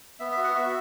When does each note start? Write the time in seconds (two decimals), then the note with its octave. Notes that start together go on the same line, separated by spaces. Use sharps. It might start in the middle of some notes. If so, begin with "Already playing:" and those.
0.20 B3 E5
0.32 E5
0.37 F#4
0.44 F#5
0.55 F#4 E5